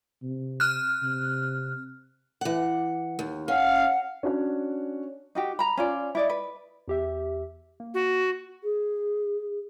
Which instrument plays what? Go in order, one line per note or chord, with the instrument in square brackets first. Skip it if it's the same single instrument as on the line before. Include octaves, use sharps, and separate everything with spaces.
[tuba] C3
[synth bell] F6 F#6
[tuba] C3
[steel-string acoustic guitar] E3 F#5
D#2
[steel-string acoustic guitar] C#4 [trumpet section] F5 [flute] F#5
[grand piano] C#4 D4 F#4 C#5
[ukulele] D#4 F#4 G4
A#5 B5
C#4 F4 D5
E4 D5 D#5
B4
[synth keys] E2 G4 E5
A#3
[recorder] F#4
[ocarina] G#4